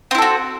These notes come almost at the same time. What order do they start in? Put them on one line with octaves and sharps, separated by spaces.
C4 E4 A4 F#4